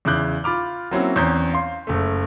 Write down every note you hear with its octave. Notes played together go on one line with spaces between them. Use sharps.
E2 C#3 E4 D6 F#6 G6
F4 B5 D6 F6
F#3 A#3 C4 C#4 E4 F#4
E2 C4 C#4 A#5 G6
F5 C6
F#1 A3